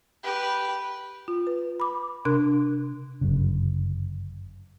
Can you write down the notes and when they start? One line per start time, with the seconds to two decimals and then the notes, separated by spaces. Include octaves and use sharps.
0.24 G4 B4
1.28 F4
1.47 B4
1.80 B5 D6
2.25 C3 D4 A#4 F#6
3.21 G1 F#2 C#3